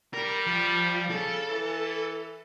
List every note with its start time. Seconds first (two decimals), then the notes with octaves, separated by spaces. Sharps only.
0.14 G3 A#4
0.47 F3
1.10 C#3 A4
1.50 E3